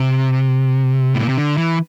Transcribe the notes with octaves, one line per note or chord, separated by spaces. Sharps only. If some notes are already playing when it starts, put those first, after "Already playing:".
Already playing: C3
A2
A#2
C3
D3
E3